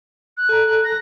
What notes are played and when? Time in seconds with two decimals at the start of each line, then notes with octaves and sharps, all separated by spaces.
0.37 F#6
0.49 A4 A#5
0.84 A#6